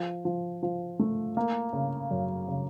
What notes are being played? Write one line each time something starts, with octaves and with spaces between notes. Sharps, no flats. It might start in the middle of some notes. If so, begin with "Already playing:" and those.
Already playing: F3
F3
F3
A3
A#3
C#3
F#2
C#3